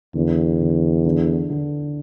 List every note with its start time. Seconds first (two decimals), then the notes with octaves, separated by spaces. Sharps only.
0.15 E2 D3
0.61 D3
1.05 D3
1.50 D3